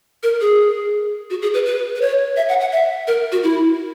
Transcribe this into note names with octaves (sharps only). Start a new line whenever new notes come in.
A#4
G#4
F#4
G#4
B4
B4
B4
C#5
E5
F#5
F#5
E5
A#4
F#4
E4